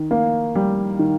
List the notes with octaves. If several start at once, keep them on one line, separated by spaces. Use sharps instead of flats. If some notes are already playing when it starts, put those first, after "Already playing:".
Already playing: D#3
A#3
G3
D#3